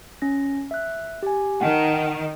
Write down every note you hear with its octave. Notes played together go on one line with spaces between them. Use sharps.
C#4 A#6
E5 F#6
G4 G#5
D#3 F#5 G5 A5